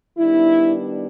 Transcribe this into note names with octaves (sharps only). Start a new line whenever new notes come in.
D#3 G3 B3 D4 E4